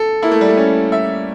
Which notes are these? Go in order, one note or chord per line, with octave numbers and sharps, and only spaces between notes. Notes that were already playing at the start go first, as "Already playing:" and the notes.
Already playing: A4
A#3 E4
A3
G3
A3
C#4
E5